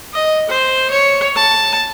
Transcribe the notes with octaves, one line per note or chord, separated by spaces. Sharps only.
D#5
C5
C#5
A5